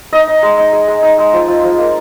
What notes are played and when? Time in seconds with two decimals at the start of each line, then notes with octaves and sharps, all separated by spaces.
0.13 D#4 D#5
0.27 D#4
0.43 G#3
0.58 D#4
0.73 G#3
0.88 G#3
1.03 D#4
1.18 G#3
1.33 F3
1.48 F3
1.63 F3
1.79 A#3